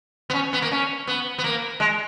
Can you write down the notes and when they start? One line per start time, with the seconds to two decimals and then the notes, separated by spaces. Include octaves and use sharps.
0.30 B3
0.34 C#4
0.53 B3
0.62 A#3
0.71 C#4
1.07 B3
1.38 B3
1.44 A#3
1.80 G#3